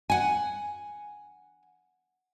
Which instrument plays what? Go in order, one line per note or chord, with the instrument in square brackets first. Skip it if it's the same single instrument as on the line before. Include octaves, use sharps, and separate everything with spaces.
[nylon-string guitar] F#5 G#5